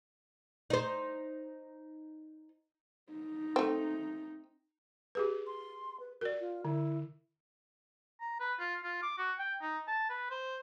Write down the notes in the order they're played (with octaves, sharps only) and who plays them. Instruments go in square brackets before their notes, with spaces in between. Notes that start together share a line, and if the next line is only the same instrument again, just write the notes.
[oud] D#4 C5
[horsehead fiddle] D#4
[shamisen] A3 C4
[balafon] G4 G#4 B4
[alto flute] C6
B4
[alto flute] F#4 [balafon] A#4 D5
[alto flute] F4
[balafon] D3 [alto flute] E4
[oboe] A#5
B4
F4
F4
D6
F#4
G5
D#4
A5
B4
C5